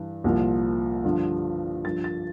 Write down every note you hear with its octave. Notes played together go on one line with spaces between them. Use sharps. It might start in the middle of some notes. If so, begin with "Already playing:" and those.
Already playing: G2 E3
C2 A#2 F3
G2 D3 F3
G2 F3 A6
A6